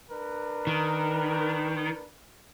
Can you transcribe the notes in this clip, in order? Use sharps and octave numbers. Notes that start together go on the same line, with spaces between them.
D4 A#4 B4
D#3